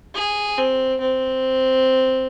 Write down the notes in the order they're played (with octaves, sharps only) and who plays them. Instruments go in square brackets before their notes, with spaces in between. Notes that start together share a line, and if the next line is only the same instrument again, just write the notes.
[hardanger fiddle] G#4
C4
C4